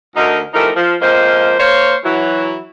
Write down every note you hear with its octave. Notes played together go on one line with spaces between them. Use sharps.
D2 D#4 A#4
E3 F3 A3 D#4 G4 A#4
F3
F2 F3 G#3 A#3 C5
A#3 C5 C#5
E3 F#3 E4